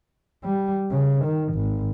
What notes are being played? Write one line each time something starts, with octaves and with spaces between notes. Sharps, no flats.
G3
C#3
D#3
G#1